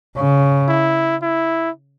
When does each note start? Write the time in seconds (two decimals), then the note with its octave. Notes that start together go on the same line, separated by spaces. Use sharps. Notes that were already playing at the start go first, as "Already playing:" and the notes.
0.16 C#3
0.68 E4
1.22 E4